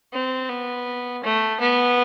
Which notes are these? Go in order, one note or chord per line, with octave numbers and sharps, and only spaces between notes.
C4
B3
A3
B3